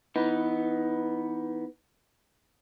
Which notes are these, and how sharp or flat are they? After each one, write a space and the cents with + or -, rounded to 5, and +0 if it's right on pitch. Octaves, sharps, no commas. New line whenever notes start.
E3 +0 B3 +0 D#4 +20